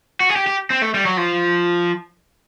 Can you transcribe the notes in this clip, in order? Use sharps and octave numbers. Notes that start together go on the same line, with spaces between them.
F#4
G#4
G4
G4
C4
A3
G3
F#3
F3